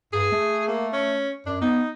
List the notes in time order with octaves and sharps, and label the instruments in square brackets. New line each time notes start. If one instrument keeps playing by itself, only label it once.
[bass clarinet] G2 [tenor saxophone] G#4
[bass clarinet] A3
[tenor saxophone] A#3
C#4
[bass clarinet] F#2 [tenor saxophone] D4
[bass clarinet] B3 [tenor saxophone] D#4